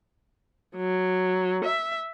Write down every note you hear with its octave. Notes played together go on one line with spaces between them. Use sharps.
F#3
E5